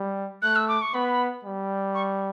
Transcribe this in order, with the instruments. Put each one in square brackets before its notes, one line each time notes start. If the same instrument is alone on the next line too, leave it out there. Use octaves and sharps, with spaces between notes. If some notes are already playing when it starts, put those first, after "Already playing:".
Already playing: [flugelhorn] G3
[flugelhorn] A3 [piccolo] F#6
[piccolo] E6
D6
C#6
[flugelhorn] B3 [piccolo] B5
[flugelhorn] G3
[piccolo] C#6